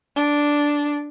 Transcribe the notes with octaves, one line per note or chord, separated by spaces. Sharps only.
D4